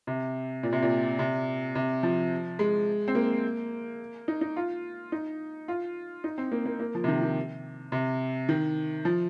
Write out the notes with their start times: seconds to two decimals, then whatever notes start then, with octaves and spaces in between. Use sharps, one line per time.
0.07 C3
0.63 A#2
0.73 C3
0.82 A#2
1.19 C3
1.75 C3
2.03 F3
2.59 G#3
3.08 C4
3.15 A#3
4.28 D#4
4.41 D#4
4.56 F4
5.12 D#4
5.68 F4
6.24 D#4
6.38 C4
6.52 A#3
6.66 A#3
6.80 A#3
6.95 F3
7.04 C3
7.08 D#3
7.22 D#3
7.92 C3
8.49 D#3
9.05 F3